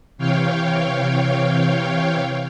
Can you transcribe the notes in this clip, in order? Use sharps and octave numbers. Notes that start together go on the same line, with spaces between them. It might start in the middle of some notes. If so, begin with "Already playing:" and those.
C3 E3 C#5 F5 G5